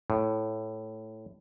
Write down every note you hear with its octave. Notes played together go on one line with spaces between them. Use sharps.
A2